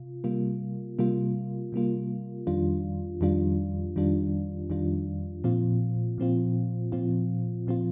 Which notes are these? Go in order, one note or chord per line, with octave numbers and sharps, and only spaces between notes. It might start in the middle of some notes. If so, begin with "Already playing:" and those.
Already playing: C3 F4
C3 G3 A#3 F4
C3 G3 A#3 F4
C3 G3 A#3 F4
F2 D#3 G3 D4 F4
F2 D#3 G3 D4 F4
F2 D#3 G3 D4 F4
F2 D#3 G3 D4 F4
A#2 F3 C4 F4
A#2 F3 C4 F4
A#2 F3 C4 F4
A#2 F3 C4 F4